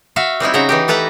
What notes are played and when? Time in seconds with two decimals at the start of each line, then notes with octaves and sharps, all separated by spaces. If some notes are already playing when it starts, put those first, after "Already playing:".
0.16 F#4 E5 F5
0.40 G3 C4 D#4 E4
0.54 C#3 D#4 F#4 E5 A#5
0.69 E3 D#4 G4
0.88 A3 A4 B4 A5 A#5